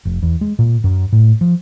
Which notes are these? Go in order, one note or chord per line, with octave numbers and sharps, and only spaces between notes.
F1
E2
G#3
A#2
F#2
A2
F3